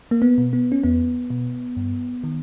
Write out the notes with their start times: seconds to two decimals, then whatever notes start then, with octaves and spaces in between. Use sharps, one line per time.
0.11 A#3
0.22 B3
0.38 B2
0.53 B3
0.72 C#4
0.84 E2 B3
1.30 B2
1.77 G2
2.24 D#3